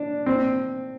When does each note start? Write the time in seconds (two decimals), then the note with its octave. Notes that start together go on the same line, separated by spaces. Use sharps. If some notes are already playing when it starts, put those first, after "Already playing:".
Already playing: D4
0.26 C4